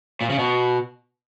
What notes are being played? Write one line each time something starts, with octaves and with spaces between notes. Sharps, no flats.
A#2
C#3
B2